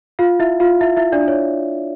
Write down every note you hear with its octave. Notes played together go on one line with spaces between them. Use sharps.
F4 F5
E4 E5
F4 F5
E4 E5
E4 E5
D4 D5
C#5